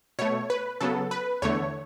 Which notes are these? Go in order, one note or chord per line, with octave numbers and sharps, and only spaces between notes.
B2 A3 C#5
B4
C#3 F#3 B3 A4
B4
E2 D3 A3 C#5